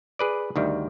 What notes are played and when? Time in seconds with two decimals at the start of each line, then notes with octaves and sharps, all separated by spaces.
0.19 G#4 B4 D5
0.56 D2 D#3 G3